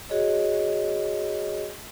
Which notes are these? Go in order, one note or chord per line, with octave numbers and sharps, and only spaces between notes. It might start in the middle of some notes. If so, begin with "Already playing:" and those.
F#4 G#4 C#5 D#5